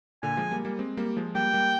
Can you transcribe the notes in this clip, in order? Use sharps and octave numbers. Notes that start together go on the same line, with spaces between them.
A#2 D3 G#5
F3 G#3
G3 A#3
G3 A#3
G#3 C4
G3 A#3
F3 G#3
G3 A#3 G5
G3 A#3